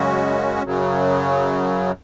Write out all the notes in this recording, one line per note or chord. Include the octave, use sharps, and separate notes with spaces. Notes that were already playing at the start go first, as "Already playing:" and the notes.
Already playing: F#2 C#3 G#3 C#4 F#4
F#2 C#3 F#3